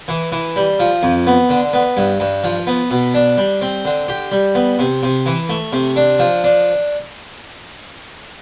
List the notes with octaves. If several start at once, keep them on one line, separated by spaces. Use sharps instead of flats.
E3
E3
G3
F3
F2
B3
D3
B3
G2
G2
F3
B3
B2
D4
G3
C4
D3
G4
G3
B3
C3
C3
E3
A3
C3
D4
F3
D4